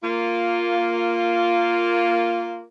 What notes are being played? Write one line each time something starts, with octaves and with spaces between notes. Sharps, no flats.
A#3 F4